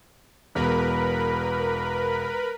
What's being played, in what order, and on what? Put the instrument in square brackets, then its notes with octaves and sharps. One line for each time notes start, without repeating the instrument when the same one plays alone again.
[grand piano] E1 E2 [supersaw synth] A#4 B4 B5